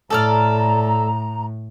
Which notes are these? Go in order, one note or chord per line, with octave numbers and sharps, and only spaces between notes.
A2 A4 D5 A#5 F6